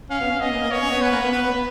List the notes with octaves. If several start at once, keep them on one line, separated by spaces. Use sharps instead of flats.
C#4 F5
B3
C#4
B3 D#5
A#3
A#3
B3 C#5
C#4
B3
B3 B4
A#3
B3
B3 B4
B3
B3